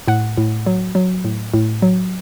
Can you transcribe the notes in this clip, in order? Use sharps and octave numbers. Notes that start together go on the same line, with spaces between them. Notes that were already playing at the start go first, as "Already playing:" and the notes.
A2 F#5
A2
F#3
F#3
A2
A2
F#3